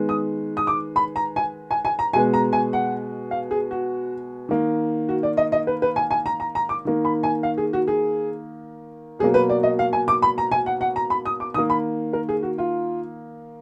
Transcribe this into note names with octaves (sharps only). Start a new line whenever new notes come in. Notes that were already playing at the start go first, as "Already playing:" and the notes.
Already playing: D#3 G#3 B3
D#6
D#6
D6
B5
A#5
G#5
G#5
G#5
A#5
B2 G#3 B3 G#5
A#5
G#5
F#5
F5
G#4
F#4
D#3 A#3
F#4
D5
D#5
D#5
B4
B4
G#5
G#5
A#5
A#5
A#5
D6
D#3 A#3
B5
G#5
F5
G#4
F#4
G#4
B2 F#3 A#3 G#4
B4
D5
D#5
F5
G#5
D6
B5
A#5
G#5
F#5
F#5
A#5
B5
D#6
D6
D#3 A#3 D#6
B5
A#4
G#4
F#4
F4